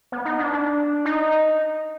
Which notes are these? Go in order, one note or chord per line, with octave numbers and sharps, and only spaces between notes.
B3
D#4
D4
D4
D#4